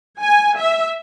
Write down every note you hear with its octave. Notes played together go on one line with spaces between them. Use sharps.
G#5
E5